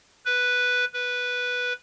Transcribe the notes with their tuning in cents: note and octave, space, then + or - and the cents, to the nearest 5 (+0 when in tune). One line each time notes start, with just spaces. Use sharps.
B4 +0
B4 -5